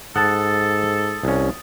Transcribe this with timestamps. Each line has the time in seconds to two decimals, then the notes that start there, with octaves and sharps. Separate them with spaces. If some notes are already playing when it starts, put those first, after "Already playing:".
0.16 G#2 A4 F#5 A5 D#6 A6
1.23 C2 C#4